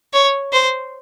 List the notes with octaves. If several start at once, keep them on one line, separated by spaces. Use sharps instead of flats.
C#5
C5